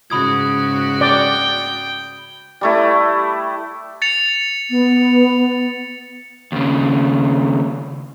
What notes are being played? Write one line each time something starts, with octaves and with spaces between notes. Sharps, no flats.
G#2 C#3 F#4 B5 D#6 G#6
D5 G5
G3 A3 E4
A6 C#7 F7
B3
D#2 C#3